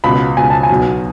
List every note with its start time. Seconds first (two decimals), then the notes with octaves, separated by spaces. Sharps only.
0.04 C#2 B2 B5
0.37 C#2 B2 G#5
0.50 A5
0.63 G#5
0.70 B1 B2